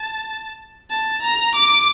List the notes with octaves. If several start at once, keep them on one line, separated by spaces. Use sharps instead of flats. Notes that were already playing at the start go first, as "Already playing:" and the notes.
Already playing: A5
A5
A#5
D6